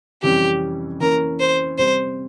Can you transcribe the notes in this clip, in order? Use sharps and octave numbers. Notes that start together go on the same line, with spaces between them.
F2 C3 E3 G3 C#4 G4
E3 A#3 C#4 A#4
C5
C3 G3 C4 C5